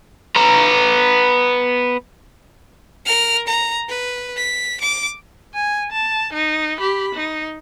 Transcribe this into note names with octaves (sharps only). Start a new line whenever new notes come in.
B3 A#5
A#4 F6
A#5
B4
B6
D6
G#5
A5
D#4
G4 B5
D#4